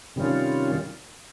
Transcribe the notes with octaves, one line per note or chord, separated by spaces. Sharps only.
C3 D#3 G3 C#4 F4